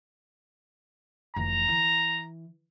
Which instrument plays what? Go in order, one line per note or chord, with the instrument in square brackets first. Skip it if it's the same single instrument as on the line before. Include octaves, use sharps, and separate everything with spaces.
[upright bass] F1 E3 [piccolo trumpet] A#5
[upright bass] E3